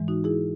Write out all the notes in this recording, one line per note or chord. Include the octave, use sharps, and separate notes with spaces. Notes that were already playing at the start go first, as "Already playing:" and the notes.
Already playing: G#2 E3 G#3
D#4 F#4
E4 G#4